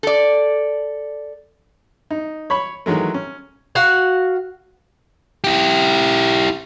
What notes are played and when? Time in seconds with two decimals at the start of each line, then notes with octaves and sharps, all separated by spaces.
0.03 A4 D5
2.11 D#4
2.50 C#5 B5 C#6
2.86 D#3 E3 F#3 G#3 A3
3.14 C#4
3.75 F#4 F5 F#5
5.44 E4 G4